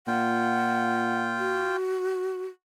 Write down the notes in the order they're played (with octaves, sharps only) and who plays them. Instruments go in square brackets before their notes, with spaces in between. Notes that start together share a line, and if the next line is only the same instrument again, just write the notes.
[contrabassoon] A#2 [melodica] F4 G5 [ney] F#5
[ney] F#4